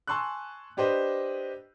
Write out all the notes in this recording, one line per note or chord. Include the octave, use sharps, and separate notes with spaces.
G#5 A5 C6 C#6 E6 F#6
D4 G4 B4 C5 D#5